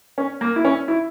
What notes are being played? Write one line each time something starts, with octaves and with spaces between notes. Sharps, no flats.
C#4
A#3
E4
C#4
E4